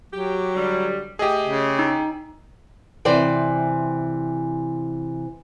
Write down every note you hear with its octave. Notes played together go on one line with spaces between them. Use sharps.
F#3 G4
D3 G3
A3 G4 G#4 D#5
C#3
D#4
C3 E3 C5 D5 G5